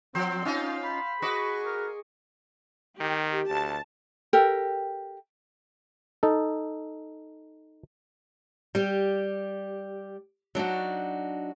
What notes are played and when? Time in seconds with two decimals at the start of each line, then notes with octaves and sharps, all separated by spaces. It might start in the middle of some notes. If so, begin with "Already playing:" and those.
0.15 F3 F#3 C4 C5 F#5
0.45 C#4 D#4 F4 F5
0.84 B5
1.22 F#4 G#4 B4 D#5 C#6 D6
1.65 A#4
3.00 D#3 G4
3.50 D2 A5
4.33 G4 A4 A#4 G5
6.23 D#4 A4
8.75 G3 G4
10.55 F#3 D4 D#4 F#4